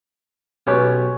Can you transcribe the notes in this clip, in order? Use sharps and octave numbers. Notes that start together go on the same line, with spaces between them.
B1 C#4 G4 B4